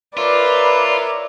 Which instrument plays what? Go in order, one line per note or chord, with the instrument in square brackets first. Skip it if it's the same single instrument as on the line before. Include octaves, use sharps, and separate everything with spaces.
[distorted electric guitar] F4 [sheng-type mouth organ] A#4 C#5 E5 [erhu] B4 [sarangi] D5